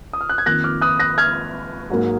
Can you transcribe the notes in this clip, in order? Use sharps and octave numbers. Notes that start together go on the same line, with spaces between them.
D#6
F6
F#6
G#6
F2 D#3 A#3 F#6 A#6
D6 F6
D#6 F#6
F#6 A#6
F6 G#6
G#2 F#3 A#3